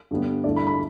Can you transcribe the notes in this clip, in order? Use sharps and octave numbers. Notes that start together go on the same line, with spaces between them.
G2 D3 G3 B3
G2 D3 A3 E4 D5
B5
B5